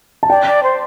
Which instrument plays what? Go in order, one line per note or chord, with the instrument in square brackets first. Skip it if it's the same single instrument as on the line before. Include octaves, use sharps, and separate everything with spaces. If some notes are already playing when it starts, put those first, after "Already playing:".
[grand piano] A5
[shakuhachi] D5 [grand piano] G5
[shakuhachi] D5
C5